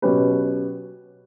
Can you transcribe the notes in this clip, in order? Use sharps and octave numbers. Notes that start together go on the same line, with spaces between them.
B2 F#3 C#4 G4 B4